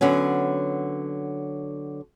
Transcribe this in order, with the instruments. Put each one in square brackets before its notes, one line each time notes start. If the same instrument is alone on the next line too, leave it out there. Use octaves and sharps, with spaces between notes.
[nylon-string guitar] D3 F#3 B3 C#4